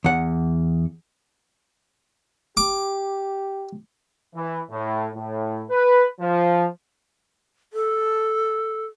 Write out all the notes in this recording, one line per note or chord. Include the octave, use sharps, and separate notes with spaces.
E2 F#5
G4 D6
E3
A2
A2
B4
F3
A4